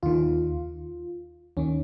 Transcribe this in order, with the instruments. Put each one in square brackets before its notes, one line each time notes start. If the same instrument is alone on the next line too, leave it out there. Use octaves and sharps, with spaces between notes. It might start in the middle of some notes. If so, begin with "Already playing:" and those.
[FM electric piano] D#2 D#3 F4
D#2 D#3 C#4